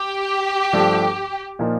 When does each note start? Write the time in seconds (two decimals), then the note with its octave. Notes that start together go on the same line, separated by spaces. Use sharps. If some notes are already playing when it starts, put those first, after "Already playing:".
Already playing: G4
0.73 G2 F3 A3 D4 A4
1.59 A#2 F3 A#3 D#4